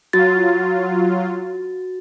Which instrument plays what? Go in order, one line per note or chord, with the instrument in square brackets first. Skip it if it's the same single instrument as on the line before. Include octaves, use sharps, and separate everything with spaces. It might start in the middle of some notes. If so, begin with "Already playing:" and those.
[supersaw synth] F#3 F4 [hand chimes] F#4 A6